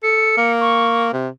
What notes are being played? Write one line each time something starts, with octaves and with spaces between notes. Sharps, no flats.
A4 C#7
A#3
C#6
C3